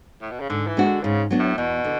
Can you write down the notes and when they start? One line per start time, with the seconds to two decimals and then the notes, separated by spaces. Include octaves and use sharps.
0.22 A2
0.31 B2
0.40 C#3
0.49 G#2 D3
0.67 E3
0.77 G#3 D4 F#4
0.86 D3
1.03 G#2 C#3
1.31 F#3 B3 D4
1.40 A2
1.58 E2 B2
1.84 D3